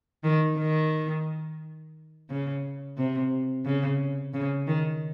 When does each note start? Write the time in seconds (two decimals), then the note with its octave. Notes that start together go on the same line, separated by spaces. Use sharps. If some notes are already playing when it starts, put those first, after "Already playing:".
0.24 D#3
0.58 D#3
2.29 C#3
2.97 C3
3.65 C#3
4.33 C#3
4.67 D#3